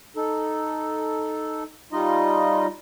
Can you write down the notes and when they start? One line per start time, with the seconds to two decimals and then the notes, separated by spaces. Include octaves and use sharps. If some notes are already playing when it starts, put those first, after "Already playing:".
0.16 D#4 A4
1.92 G3 D#4 F4 D#5